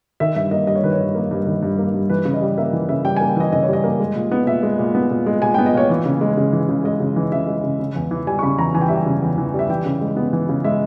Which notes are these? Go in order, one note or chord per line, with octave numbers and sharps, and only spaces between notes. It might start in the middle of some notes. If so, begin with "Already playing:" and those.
D#3 E5
G2 E5
A#3 D#5
G2 D#5
C#5
D#3 B4
C#5
G2
A#3
G2
D#3
G2
A#3
G2
E3 B4
C#3
D#5
G3
A#3 E5
E3
C#3 E5
G3 G5
A#3 G#5
G5
E3 D#5
C#3 D#5
C#5
G3 D#5
A#3
G#3
A#2
B3
A#2 E5
G#3
A#2
B3
A#2
G#3
A#2 G#5
B3 G5
D#5
A#2 C#5
E3
C#3
G#3
C#3
E3
C#3
G#3 D#5
C#3
E3
C#3 E5
G#3
C#3
C#3
E2
E3
G3 G#5
C#6
C#3 B5
E2 A#5
E3 G#5
G5
G3 E5
G5
C#3
E2
E3
G3 E5
E3 G5
C#3
G#3
B3
E3
C#3
G#3 E5